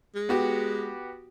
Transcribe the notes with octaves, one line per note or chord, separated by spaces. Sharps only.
G#3
B3 F#4 G4